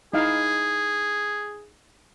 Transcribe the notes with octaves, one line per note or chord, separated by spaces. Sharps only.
D#4 E4 G#4 F5